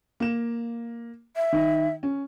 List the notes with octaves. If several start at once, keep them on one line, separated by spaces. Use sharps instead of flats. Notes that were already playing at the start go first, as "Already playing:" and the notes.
A#3 E7
E5
D#3 D#4
C#4